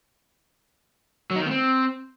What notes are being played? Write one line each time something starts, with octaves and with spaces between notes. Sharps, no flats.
F#3
D#4
D#3
B3
C4